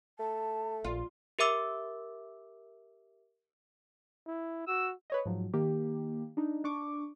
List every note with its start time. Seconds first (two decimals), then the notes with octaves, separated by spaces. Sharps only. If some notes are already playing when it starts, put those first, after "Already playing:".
0.19 A3 A5
0.84 A#1 F4
1.39 G4 A#4 E5 D6 E6
4.27 E4
4.67 F#4 E6
5.10 B4 C#5 D#5
5.25 G#2 F3 F#3
5.53 D#3 A#3 G4
6.37 D4 D#4
6.64 D4 C#6 D6